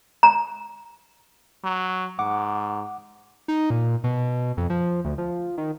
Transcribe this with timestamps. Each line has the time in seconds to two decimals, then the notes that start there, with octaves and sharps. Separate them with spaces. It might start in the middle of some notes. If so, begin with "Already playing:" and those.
0.23 A#5
1.64 F#3
2.19 G#2 F#5 D6
3.48 D#4
3.70 A#2
4.04 B2
4.57 F2
4.70 F3
5.05 D2
5.18 F3
5.58 D#3